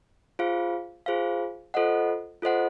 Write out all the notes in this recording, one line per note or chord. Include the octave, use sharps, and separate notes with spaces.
F4 G#4 C5 F5
F4 G#4 C5 F5
F4 A4 C5 D#5 F#5
F4 A4 C5 D#5 F#5